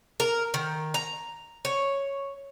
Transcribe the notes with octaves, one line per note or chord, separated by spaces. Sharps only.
A#4
D#3
A#5
C#5